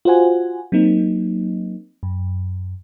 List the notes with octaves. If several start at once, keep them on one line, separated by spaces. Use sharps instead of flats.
F4 F#4 C5 F#5 G#5
F#3 A#3 C4 D#4
F#2